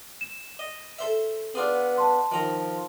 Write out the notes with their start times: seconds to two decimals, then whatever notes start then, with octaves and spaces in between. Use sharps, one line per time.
0.21 E7
0.59 D#5
0.99 A4 C5 E5
1.55 B3 D4 F4 G#4
1.97 A5 C6
2.32 D#3 F3 A#5